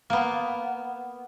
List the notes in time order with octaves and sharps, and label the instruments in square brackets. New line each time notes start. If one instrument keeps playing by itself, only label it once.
[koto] A#3 B3